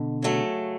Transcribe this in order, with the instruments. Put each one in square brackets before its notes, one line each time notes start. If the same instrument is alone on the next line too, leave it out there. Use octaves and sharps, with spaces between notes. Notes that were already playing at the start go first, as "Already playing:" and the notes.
Already playing: [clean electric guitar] B2 D3
[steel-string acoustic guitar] C#3 F#3 A3